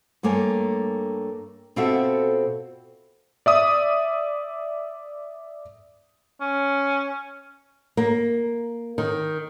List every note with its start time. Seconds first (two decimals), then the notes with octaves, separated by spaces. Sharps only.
0.23 G2 A3 A#3 C#5 G#5
1.76 B2 C4 F4 F#4 A4 E5
3.46 D5 E5 D#6
6.41 C#4
7.97 A#3
8.98 D#3